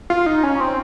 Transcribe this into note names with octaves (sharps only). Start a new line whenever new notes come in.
F4
D#4
C#4
C4